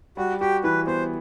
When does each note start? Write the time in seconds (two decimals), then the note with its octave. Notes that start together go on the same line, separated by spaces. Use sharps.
0.17 G3 F#4
0.41 F#4 G4
0.64 E3 B4
0.87 B3 C5